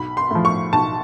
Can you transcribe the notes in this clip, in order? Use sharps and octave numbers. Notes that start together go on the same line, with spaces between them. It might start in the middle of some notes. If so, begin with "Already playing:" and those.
Already playing: B1 B5
C6
A2 F3
C#6
B1 A5